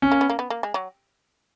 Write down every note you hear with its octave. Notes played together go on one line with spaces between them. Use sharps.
C#4
A#3
B3
A#3
B3
A#3
G#3
F#3